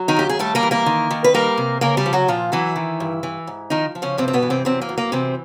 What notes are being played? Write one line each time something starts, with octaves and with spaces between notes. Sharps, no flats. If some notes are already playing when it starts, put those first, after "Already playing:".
Already playing: F#3
D#3 D#4
D#2 G4
G#4
G3 A3 A4
A#3 A#4
E3
A#3 A#4
D#3
D#3
B4
G3 A#3 A#4
C3
C#3 A#3 A#4
G3 G4
F3
F#3 F#4
A#2 F3 F4
E3 F#3 E4
D#3
G2
E3
G#2
D#3 F3 D#4
F3
C#3 C#4
G2 C3 C4
C4
B2 B3
E3
C3 C4
F#2 C3 C4
A#3
F#2
A#3
C3 E3 C4